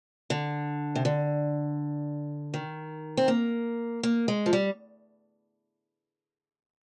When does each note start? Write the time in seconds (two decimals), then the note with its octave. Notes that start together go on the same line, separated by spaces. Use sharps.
0.30 D3
0.95 C3
1.05 D3
2.54 D#3
3.17 C4
3.28 A#3
4.03 A#3
4.28 G#3
4.46 F3
4.53 G3